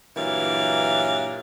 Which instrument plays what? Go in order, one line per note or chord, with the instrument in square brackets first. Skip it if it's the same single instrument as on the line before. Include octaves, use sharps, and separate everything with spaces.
[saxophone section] G2 A#2 E3 F#3 A#4 F5